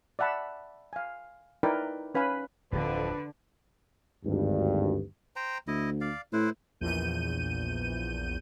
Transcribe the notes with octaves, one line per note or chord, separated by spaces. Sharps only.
D5 E5 F#5 A5 B5
F5 G#5
D#4 E4 A#4 B4 D5 G5
C#4 B4 F5 G#5 B5
D1 F2 D3 F3 B4
G#1 D2 G2
C5 G5 A#5
D2 E4 D#5
D5 F5
A2 E4 B4 C5
A#1 E2 G6 D#7